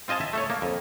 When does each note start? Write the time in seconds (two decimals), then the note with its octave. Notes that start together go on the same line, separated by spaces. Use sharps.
0.08 C4 F4 D#5 G#5 A5
0.21 E5
0.33 A3 A4 C#5
0.50 A#3
0.62 F2